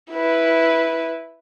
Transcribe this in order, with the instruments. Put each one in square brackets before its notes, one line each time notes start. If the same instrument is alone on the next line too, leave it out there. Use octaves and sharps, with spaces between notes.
[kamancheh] E4 B4